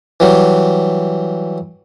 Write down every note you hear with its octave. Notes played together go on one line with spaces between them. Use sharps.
E3 F#3 G3